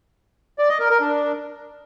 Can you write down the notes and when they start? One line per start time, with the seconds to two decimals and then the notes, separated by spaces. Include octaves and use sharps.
0.59 D5
0.69 D#5
0.79 A#4
0.90 A#4
1.00 D4